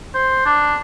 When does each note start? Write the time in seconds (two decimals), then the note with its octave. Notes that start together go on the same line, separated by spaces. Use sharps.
0.15 C5
0.46 D4